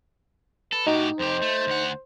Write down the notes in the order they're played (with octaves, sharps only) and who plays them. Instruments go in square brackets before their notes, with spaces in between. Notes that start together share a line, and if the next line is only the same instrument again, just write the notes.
[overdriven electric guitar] A4 [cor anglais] B4
[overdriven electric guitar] A2 G4 [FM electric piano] D#4 [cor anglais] F#4
[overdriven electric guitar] F2 G4 [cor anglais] C5
[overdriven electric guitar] A3
D2 F#5